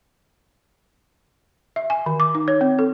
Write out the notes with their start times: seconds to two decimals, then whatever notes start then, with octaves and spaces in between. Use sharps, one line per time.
1.76 E5
1.90 G#5
2.06 D#3
2.20 D6
2.35 D#4
2.48 C#5
2.61 C4
2.79 A4